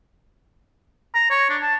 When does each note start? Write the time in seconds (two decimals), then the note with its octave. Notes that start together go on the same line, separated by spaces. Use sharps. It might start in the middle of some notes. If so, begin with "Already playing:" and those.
1.15 A#5
1.30 C#5
1.49 D4
1.62 A5